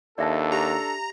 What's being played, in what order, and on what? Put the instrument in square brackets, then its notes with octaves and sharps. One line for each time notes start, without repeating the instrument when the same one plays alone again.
[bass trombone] D#2 [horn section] D4 A4 [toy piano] D5 E5 A5
[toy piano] G4 [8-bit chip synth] A#5